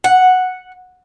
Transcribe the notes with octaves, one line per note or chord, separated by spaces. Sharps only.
F#5